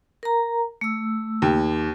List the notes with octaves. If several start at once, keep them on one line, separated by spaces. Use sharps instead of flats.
A#4 A#5
A3 E6
D#2